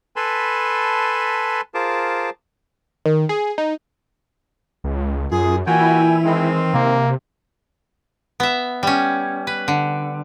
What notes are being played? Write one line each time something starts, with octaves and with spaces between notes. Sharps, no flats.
A4 B4 G#5 A5 B5 C6
F4 G#4 A#4 C5 A5 D6
D#3
G#4
D#4
C#2
F#2 F4 G#4
A#2 E3 E4 F#4 G5 G#5
D#3 G#3 C4
C3 A#3
B3 E5
G3 C#4
B4
D3